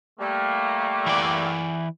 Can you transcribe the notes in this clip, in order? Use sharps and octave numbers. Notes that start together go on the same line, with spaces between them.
G3 A3 A#3
E3 D5